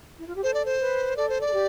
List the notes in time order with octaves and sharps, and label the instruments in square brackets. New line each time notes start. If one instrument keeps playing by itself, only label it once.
[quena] E4
F4
G4
[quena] A4 [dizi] C5
[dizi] D5
C5
[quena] B4
[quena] A4 [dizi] D5
[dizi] C5
D5
[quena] A4
G4